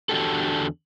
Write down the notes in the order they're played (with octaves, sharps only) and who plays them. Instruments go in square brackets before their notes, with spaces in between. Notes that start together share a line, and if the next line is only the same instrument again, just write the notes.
[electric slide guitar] E2 D3 D4 F#4 G4 A4